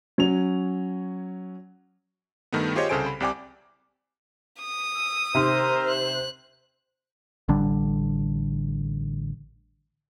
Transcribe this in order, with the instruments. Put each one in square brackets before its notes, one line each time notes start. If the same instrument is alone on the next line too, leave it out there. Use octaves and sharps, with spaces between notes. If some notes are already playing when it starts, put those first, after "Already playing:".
[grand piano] F#3 C#4 F7
[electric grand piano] G2 D#3 A3 B3
F4 G4 G#4 C5 C#5 D#5
C2 C#3 A4 C5 G#5 D7
B5
C2 C3 D5 G5 G#5 D6
[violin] D#6
[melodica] E6
[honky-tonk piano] C3 D#3 C6 [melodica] A#4 E5 A#5 [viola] C5
[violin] F#6
[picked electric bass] A1 D3 G3 D4